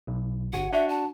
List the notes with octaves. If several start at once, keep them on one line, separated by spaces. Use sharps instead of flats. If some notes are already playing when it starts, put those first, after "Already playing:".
B1
G1 F#4 F#5 G#5
D4 F#4 E5 F#5
A5